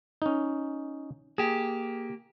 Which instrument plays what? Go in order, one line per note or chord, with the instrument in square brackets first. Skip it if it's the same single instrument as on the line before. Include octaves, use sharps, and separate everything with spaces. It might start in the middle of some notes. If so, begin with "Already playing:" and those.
[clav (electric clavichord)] C#4 D#4
[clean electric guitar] A#3 G4 [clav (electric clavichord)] G#4